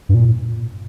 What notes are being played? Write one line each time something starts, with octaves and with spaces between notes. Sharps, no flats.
G2
A#2